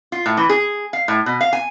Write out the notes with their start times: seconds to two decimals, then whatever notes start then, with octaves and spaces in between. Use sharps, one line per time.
0.12 F4
0.26 A2
0.37 E3
0.49 G#4
0.93 F5
1.08 A2
1.26 B2
1.41 F5
1.53 G#5